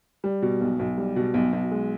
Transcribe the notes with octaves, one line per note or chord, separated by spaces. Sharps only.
G3
B2
B1
B1
G3
B2
B1
B1
G#3